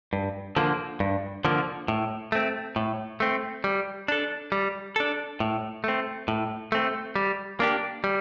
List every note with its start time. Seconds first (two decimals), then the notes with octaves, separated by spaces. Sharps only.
0.13 G2
0.56 D3 F3 A#3
1.00 G2
1.45 D3 F3 A#3
1.88 A2
2.32 A3 C4
2.76 A2
3.20 A3 C4
3.64 G3
4.08 D4 A4
4.52 G3
4.96 D4 A4
5.40 A2
5.84 A3 C4
6.28 A2
6.72 A3 C4
7.15 G3
7.60 A#3 D4 G4
8.04 G3